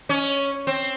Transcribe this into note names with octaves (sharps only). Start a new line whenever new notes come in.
C#4
C4